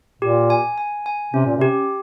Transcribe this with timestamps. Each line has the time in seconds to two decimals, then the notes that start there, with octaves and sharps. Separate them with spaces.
0.22 A#2 G4
0.50 G#5
0.78 G#5
1.06 G#5
1.34 C3 C#4
1.46 A#2
1.57 C3 G4